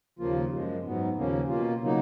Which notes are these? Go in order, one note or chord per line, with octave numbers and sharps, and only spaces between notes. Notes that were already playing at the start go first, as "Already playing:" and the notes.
D#2 C#3 F3 A#3 F4
F#2 F3 G#3
G#2 F#3 B3
D#2 C#3 F3 A#3 C#4
B2 A#3 F4
C#3 F#3 A#3 D#4